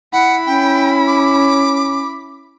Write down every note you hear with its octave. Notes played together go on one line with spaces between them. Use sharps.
E4 F#5 B5
C#4 G5
D6